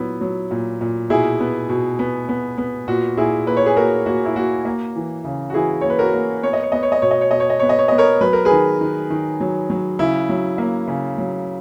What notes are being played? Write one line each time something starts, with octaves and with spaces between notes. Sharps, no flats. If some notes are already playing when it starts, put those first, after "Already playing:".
Already playing: A#2 F#3 B3 E4
F#3
A#2
A#2
B2 E4 G#4
B3
B2
B3
B3
B3
A#2 F#4
A#2 E4 G#4
A#3 B4
C#5
G#4 B4
A#3 F#4 A#4
A#3 F#4
E4
A#3 F#4
A#3
E3
C#3
F#4
E3 E4 G#4
A#3 C#5
B4
F#4 A#4
A#3
B3 C#5
D#5
C#5
B3 D#5
C#5
D#5
B2 C#5
D#5
C#5
B2 D#5
C#5
D#5
B3 C#5
D#5
C#5
B3 D#5
A#4 C#5
F#3 B4
A#4
G#4 B4
D#3
D#3
D#3
F#3
F#3
C#3 E4
F#3
A#3
C#3
F#3